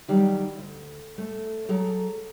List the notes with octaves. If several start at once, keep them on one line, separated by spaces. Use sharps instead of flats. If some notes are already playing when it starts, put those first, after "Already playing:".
D#3 F#3 G3
D2
A3
F#3 G#4 A4 A#5